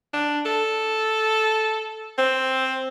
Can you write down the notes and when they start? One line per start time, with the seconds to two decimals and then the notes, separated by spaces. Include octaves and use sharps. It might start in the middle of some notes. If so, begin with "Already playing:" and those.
0.14 D4
0.46 A4
2.18 C4